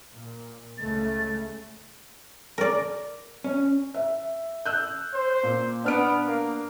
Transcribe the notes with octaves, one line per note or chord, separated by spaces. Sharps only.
A#2
C#2 C#3 A3 A6
A#4 D5
C#4
E5
E6 F#6 G6
C5
A#2
B3 D4 F6 D7
A#3